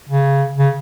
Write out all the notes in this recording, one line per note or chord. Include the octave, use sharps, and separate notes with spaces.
C#3
C#3